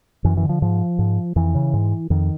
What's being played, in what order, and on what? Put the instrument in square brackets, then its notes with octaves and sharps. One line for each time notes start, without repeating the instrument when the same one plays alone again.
[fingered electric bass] F#2 E3
E3
D3
F3
G#2 F3
G#2
F2 E3
C#3
G#2
F2 D#3